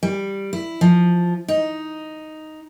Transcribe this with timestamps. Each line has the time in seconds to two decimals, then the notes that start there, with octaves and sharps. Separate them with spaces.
0.03 G3
0.53 E4
0.81 F3
1.48 D#4